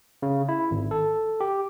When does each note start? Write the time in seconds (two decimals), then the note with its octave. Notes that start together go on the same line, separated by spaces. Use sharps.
0.22 C#3
0.49 E4
0.71 G#1
0.91 A4
1.40 G4